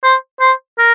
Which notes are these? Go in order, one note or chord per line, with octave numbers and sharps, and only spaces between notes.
C5
C5
A#4